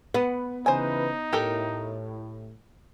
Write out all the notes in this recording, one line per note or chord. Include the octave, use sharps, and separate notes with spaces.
B3 F#5
C#3 E3 D#4 B4 C5 G#5
A2 G4 A4 A#4